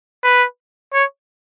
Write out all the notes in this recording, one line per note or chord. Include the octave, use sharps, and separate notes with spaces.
B4
C#5